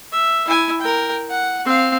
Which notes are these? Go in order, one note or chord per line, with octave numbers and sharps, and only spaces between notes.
E5
E4 G#5
A#4 G5
F#5
C4 F5